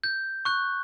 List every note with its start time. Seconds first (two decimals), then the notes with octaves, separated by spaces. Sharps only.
0.04 G6
0.45 C#6 F#6